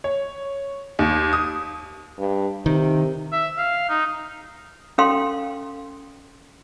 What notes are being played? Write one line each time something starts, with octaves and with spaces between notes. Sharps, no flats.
C#5
D#2
D#6
G2
C3 D#3
E5
F5
D#4
C#4 A4 F5 G5 C6